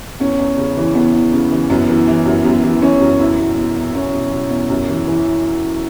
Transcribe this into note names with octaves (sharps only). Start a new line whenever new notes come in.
E2 C#4
E2
C#3
E3
E2 B3
E2
C#3
E3
F#2 B3
E3
E3
F#2
F#2 B3
E3
E3 C#4
F#2
E2 E4
B2
B2
E2
E2 C#4
B2
B2
E2
F#2
E3
E3